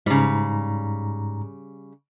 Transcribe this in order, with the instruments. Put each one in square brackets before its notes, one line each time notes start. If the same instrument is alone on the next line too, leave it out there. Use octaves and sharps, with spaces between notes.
[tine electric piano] G#2 A#5 [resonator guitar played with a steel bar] C#3 G3